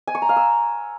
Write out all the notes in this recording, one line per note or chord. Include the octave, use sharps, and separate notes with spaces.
G#5
C#6
A#5
F5
E6